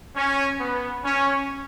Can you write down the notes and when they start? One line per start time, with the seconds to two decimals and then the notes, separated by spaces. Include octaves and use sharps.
0.17 C#4
0.60 B3
1.05 C#4